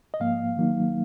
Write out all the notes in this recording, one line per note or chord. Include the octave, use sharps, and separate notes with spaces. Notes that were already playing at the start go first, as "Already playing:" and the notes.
D#5
G#2 F3 A#3 F5
D#3 F#3 A#3 D#4